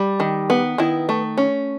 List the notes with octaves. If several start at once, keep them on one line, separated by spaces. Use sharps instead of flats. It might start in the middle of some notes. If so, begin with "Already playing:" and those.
Already playing: G3
D#3
B3
D#3 E4
A3
C#4